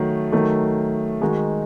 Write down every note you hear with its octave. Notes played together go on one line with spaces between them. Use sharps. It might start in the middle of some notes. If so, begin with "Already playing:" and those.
Already playing: D#3 F#3 A3
D#3 F#3 A3
D#3 G#3 D#4 F#4